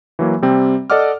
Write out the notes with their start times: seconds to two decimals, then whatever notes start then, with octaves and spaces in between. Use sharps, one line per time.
0.19 E3 F#3 A#3
0.42 C3 G3 C4
0.90 A4 D5 D#5 F#5 D6 F6